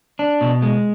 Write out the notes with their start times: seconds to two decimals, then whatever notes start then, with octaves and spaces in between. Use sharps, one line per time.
0.19 D4
0.41 B2
0.62 G#3